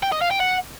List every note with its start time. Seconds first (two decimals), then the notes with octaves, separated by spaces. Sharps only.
0.03 G5
0.12 D#5
0.21 F5
0.31 G5
0.40 F#5